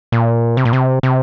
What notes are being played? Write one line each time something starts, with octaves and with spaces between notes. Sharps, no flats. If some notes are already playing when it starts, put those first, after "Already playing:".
A#2
C3
A#2
C3
C3